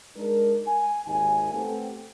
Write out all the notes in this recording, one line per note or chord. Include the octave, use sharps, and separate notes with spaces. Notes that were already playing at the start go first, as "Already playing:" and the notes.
G#3 D4 D#4 A#4
G#5
G#1 D#2 D#4 G#5
A3 B3 C4 G4 A4